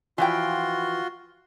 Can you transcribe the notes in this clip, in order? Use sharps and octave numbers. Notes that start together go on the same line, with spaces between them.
E3 F3 F4 F#4 G5 C6